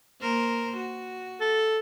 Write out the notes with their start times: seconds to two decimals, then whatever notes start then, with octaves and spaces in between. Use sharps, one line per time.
0.21 A#3 A#4 C5
0.76 F#4
1.41 A4